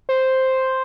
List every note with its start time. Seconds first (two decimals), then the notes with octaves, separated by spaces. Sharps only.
0.09 C5